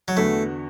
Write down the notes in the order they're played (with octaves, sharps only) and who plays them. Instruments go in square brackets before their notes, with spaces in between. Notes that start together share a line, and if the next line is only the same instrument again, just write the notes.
[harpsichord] F#3
[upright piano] E2 D3 B3 F#4 [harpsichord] A3